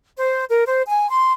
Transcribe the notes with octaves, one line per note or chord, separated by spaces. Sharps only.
C5
A#4
C5
G#5
C6